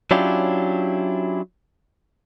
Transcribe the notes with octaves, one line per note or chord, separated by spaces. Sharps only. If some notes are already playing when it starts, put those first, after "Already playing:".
F#3 C#4 D4 E4 F4 G4